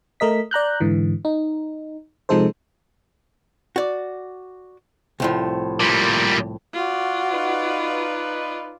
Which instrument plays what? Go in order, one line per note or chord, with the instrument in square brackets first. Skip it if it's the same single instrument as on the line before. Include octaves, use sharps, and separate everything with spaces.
[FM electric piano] A3 A#4 D#5 B6
D5 A#5 F#6 G6
G#2 D3 E3
D#4
C3 F3 G#3 D#4 A4 C5
[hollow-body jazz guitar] F#4 D5
C2 A2 F3
[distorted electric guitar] A#2 G3
[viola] F4 D5 [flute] F#4
[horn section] D#4 B4